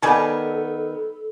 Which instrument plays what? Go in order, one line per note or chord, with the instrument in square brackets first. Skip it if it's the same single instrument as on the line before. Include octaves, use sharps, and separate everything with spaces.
[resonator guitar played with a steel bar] D#3 B3 [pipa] G3 G#5 A5 [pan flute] A4